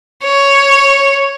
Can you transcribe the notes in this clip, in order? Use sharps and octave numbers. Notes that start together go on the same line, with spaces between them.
C#5